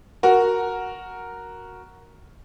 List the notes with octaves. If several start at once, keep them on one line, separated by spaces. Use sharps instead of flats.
F#4 A#4 A#5